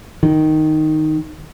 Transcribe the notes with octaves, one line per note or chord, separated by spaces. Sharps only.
D#3